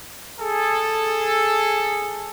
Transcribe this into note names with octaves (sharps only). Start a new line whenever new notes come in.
G#4 A4